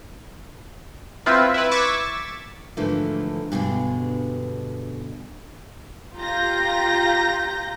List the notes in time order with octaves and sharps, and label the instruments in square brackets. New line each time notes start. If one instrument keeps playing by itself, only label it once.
[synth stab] C4 E4 F4 B4
E4 B4
C#6 D6 E6 G#6 A6 B6
[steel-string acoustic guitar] G#2 D3 E3 F3 A3 A#3
G2 B2 D3 G#3
[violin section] F4 G4 A#5 G6 A#6